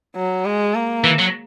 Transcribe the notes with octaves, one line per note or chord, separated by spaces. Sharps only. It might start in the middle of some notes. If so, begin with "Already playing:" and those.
F#3
G#3
A#3
E3
F#3